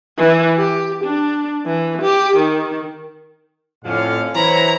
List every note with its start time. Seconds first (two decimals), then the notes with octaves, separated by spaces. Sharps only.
0.18 E3
0.57 G4
1.04 D4
1.66 E3
2.01 G4
2.36 D#3
3.85 F2 A2 D3 C#4 F5
4.35 E3 F#3 E4 C5 C#5 A#5 B5